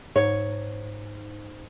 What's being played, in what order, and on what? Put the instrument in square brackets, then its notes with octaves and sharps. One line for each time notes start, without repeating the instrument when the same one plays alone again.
[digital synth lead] G#2 [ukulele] C#5